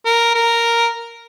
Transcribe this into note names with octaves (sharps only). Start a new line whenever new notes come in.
A#4
A#4